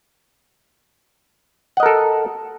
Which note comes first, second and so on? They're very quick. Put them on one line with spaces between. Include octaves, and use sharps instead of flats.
F#5 D#5 A#4 A4